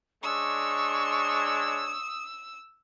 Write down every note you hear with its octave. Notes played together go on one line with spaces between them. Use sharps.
G#3 D4 C#5 C#6 D#6 E6